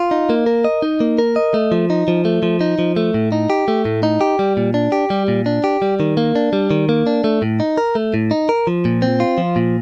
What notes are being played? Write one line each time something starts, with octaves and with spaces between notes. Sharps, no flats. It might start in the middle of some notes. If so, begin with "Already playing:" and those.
Already playing: F4
D#4
A#3
A#4
D#5
D#4
A#3
A#4
D#5
A3
F3
D#4
F3
A3
F3
D#4
F3
A3
A2
D#4
G4
A3
A2
D#4
G4
G3
A#2
D4
G4
G3
A#2
D4
G4
G3
D#3
A#3
D4
G3
D#3
A#3
D4
A3
A2
D#4
A#4
A3
A2
D#4
A#4
F3
A#2
C4
F4
F3
A#2